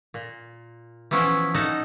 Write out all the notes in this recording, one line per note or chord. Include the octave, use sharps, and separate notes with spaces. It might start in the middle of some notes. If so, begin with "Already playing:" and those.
A#2
E3 F3 B3 C#4 E4
A#2 D#4 A4 F#5 A5